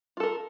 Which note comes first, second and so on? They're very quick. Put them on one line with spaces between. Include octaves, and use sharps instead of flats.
F4 A4 A#4